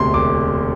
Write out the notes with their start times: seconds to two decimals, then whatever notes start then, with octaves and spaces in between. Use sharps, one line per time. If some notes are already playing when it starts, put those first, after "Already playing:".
Already playing: E1 D2 C3 C6
0.14 E1 D6